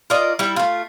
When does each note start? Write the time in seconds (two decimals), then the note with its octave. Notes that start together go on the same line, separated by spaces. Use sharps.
0.10 F4 A#4 D5 D#5
0.39 G3 E4 E5
0.56 A3 F4